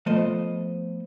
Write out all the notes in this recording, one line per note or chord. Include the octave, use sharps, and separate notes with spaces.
F3 A3 B3 C5 D#5